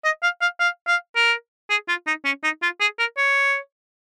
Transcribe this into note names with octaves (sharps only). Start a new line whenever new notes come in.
D#5
F5
F5
F5
F5
A#4
G#4
F4
D#4
C#4
D#4
F4
G#4
A#4
C#5